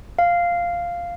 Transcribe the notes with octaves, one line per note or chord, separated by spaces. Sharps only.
F5